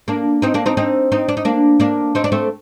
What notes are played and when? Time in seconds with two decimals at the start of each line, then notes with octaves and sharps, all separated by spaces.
0.08 A#3 D4
0.42 C4 D#4
0.54 A#3 D4
0.66 C4 D#4
0.77 C4 D#4
1.12 C4 D#4
1.28 D4
1.37 D#4
1.45 A#3 D4
1.80 A#3 D4
2.15 C4 D#4
2.24 D4
2.32 A3 C4